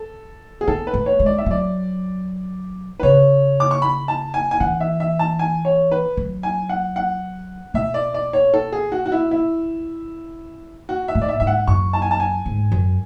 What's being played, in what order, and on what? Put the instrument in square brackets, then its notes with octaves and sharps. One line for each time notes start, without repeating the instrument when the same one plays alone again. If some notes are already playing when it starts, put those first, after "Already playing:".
Already playing: [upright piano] A4
G#4
[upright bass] B3 [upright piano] A4
[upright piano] B4
[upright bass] A3
[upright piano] C#5
[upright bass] G#3
[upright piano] D5
E5
[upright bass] F#3 [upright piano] D5
[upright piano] B4
[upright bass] C#3 [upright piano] C#5
[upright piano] D6
C#6
B5
A5
G#5
G#5
[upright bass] E3 [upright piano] F#5
[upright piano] E5
E5
A5
G#5
C#5
B4
[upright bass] F#3
[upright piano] G#5
F#5
F#5
[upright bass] B2 [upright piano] E5
[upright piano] D5
D5
C#5
A4
G#4
F#4
F#4
E4
E4
F#4
E5
[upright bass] A2
[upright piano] D5
E5
[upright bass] G#2 [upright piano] E5
[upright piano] F#5
[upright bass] F#2 [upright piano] C#6
[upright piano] A5
G#5
A5
G#5
[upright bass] G#2
F#2